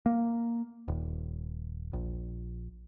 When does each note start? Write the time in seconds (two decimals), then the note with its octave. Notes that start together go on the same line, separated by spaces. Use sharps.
0.06 A#3
0.88 D#1
1.93 A#1